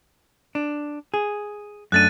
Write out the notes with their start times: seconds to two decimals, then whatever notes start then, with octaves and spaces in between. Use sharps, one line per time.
0.55 D4
1.14 G#4
1.92 F#2 A3 D4 F#6 A6 D#7